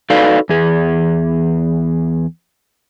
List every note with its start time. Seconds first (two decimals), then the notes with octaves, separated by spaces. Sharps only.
0.10 D#4 F#4 A4 B4 D5 F5
0.49 E2 G#4